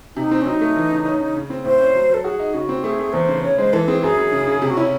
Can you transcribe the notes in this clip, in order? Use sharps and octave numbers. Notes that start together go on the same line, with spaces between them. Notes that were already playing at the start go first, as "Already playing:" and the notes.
C3 D#4
C4
C#4
F#3 D#4
A3
E3
C#3
C#4
C#3
C#3
C4
A2 C5
C#4
F#3
F#3 A4
F#4 G#4
D#4
C#3 F#4
C4
A3 G#4
A3
E2 C5
C#3
C#3 C#5
G#3 C5
E3 A4
C4 G#4
F#2 G#4
F#2
C#3
C#3
C3 G#4
F#4
C#4 E4